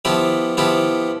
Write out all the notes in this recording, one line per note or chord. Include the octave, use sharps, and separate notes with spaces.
F3 B3 E4 G4
F3 B3 E4 G4